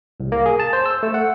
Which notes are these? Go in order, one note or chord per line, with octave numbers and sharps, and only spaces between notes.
C2
A#3
G#4
A5
C5
E6
A3
F#5